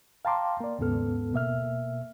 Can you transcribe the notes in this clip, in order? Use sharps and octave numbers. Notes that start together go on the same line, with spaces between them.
F5 G5 A5 A#5 C6 D6
A#3 D5
D#2 G#2 C#3 B3 A4 F6
B2 A#3 E5 F6